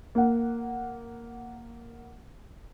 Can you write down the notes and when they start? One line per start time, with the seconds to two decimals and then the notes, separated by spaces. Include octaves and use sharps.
0.15 A#3 F#5